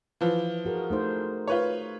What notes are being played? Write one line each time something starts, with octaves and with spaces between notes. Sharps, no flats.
E3 F3
F#4 G#4 A#4
A3 D#4 C5
F4 B4 C#5